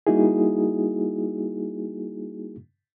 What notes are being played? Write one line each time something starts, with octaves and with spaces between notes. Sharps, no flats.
G3 A#3 D#4 E4 F#4 G#4